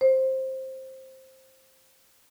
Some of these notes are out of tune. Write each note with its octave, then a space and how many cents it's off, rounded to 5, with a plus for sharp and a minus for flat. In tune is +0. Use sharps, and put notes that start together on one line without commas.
C5 +10